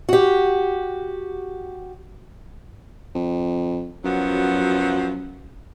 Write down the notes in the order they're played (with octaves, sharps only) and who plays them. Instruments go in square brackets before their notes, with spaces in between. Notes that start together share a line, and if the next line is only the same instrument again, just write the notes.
[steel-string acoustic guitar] F#4 G4
[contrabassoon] F2
[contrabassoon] F#2 [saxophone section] F3 F#3 B3